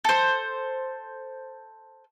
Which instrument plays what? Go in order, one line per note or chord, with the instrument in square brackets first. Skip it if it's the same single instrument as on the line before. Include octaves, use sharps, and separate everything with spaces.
[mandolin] A4 C5